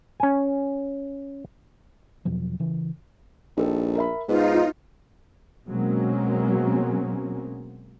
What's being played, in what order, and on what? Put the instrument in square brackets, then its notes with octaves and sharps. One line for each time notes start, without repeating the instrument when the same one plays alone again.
[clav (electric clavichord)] C#4 G#5
[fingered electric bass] E2 B2 F3 F#3
C#3 E3
[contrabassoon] A#1 [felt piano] D#4 G4 A4
[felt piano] A#4 E5 B5
[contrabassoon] G#2 [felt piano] B3 B4 D#5 [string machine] D#4 F4
[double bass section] B2 F#3 G#3 A#3 C4 C#4